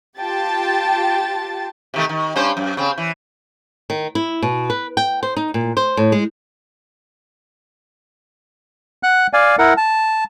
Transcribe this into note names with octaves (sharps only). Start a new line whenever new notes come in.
F4 G4 G5 A5 A6
C3 D#3 A3
D#3
G2 C#4 C5
F#2
C#3 C4
E3
D#3
E4
B2
B4
G5
C5
D#4
A#2
C5
A2
G#3
F#5 F#6
D5 F5 G#5
E4 A#4 F#5
A5